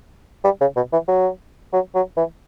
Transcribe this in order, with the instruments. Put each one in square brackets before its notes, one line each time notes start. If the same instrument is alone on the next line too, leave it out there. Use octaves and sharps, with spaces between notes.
[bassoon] G3
C#3
B2
E3
F#3
F#3
F#3
E3